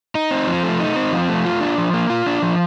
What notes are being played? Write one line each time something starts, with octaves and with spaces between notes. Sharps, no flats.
D#4
C4
F3
A3
D#4
C4
F3
A3
F4
D4
F3
A#3
F4
D4
F3